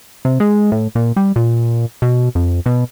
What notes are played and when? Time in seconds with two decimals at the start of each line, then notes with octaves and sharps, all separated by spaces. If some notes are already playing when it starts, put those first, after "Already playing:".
0.25 C3
0.40 G#3
0.72 A2
0.95 A#2
1.16 G3
1.36 A#2
2.02 B2
2.35 F2
2.66 B2